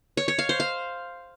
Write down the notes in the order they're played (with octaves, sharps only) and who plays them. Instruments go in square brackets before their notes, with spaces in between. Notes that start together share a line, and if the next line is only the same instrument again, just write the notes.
[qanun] C#5
C#5
F5
C5
F5